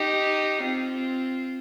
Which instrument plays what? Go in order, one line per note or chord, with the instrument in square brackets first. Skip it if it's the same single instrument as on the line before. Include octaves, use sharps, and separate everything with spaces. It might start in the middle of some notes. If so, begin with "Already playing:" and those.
Already playing: [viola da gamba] D#4 G4
C4 F4